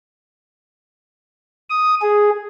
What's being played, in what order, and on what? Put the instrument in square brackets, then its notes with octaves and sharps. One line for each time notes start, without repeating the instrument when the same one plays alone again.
[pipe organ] D#6
G#4